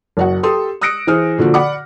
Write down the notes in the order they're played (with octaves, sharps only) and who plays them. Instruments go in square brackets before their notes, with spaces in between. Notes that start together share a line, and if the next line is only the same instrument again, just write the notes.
[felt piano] F#1 F#4 F#5
G4 A4 C6 D#6
D#6 E6 F#6 A#6 C#7 D7
E3 G#4 C5 D#6 F6
A#2 D3 F3 F#4
D5 F#5 B5 D6